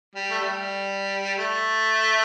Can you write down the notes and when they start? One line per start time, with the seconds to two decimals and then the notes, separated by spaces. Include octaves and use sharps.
0.15 G3
0.31 A3
0.40 G3
1.37 A3